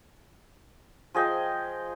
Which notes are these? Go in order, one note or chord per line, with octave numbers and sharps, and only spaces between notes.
F3 G#4 D#5 G5